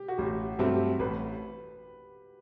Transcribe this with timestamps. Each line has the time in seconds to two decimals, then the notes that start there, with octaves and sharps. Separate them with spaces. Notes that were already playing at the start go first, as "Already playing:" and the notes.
Already playing: G4
0.08 F#4
0.18 A1 G4
0.59 G2 F#3 A3 C4 G4
0.99 A1 B4